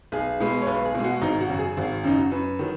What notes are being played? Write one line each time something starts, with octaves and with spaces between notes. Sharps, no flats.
B1 G#4
B2 G#3 B4
C#5
B1 B4
G#4
B2 G#3
F#4
G#1 D#4
F#4
F#2 C#3
G#4
G#1 F#4
F#2 C#3 D#4
F#4
F#2 B4
D#3 F#3